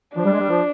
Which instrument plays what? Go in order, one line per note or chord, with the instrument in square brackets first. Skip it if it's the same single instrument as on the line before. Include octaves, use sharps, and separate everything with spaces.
[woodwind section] F3 [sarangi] D4
[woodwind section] G3
G#3
G3
F3